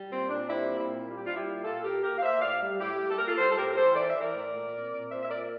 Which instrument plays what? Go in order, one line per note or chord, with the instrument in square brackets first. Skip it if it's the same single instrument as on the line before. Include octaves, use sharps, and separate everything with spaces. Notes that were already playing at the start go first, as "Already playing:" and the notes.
Already playing: [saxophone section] G3
A#2 C4
A#2 D4
G3 C4 E4
A#3
C4 E4
A#2
G3 F4
G4
G3 D4 F4
E4 G4
A#2
A#2 F4 A4
A#3 G4 A#4
A#3 G4 A#4
F5
A#3 C5 E5
A2 D5 F5
G3
A2 E4 G4
G3
A4
A#3 A#4
F4 A4
G3 A4 C5
A4
A2 G4 A#4
A#4
E3 A4 C5
E3 D5
E5
E3
A#4 D5
A2
A#2
C4
A#2
A#2 C5 E5
E5
A#2 A#4 D5